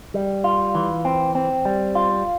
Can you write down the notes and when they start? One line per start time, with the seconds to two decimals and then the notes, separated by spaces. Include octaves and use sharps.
0.14 G3
0.44 F4
0.75 E3
1.05 C4
1.35 C4
1.65 G3
1.95 F4